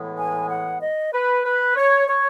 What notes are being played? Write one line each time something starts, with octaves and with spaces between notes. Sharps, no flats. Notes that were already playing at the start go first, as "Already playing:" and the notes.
Already playing: A2 E3 G#3 B3
G#5
F#5
D#5
B4
B4
C#5
C#5